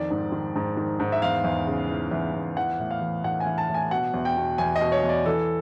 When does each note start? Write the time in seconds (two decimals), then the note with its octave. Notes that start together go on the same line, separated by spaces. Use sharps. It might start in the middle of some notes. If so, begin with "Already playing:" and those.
Already playing: F2 D#3 D5
0.10 G#2
0.32 D#3
0.56 G#2
0.77 D#3
1.00 G#2
1.12 E5
1.22 E2 F5
1.44 E2
1.67 C#3
1.89 E3
2.11 E2
2.34 E2
2.57 E3 F#5
2.80 A2
2.91 F5
3.02 E3
3.24 A2 F#5
3.40 G#5
3.47 E3
3.58 A5
3.69 A2
3.74 G#5
3.91 B2 F#5
4.14 E2
4.25 G5
4.37 B2
4.58 E2 G#5
4.76 D#5
4.81 B2
4.92 C#5
5.04 E2
5.09 D5
5.26 E3 A4